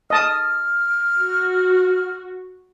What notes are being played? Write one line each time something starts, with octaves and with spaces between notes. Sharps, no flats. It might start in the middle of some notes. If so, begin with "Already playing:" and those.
D#5 A5 D#6 F6
F#4